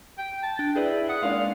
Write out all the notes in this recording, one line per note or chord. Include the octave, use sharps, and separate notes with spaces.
G5
A5
D4 G5
E4 G#4 B4 D5
F#5 D#6
G#3 A#3 D4 F5